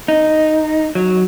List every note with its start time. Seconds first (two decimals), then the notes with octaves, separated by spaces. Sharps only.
0.08 D#4
0.95 F#3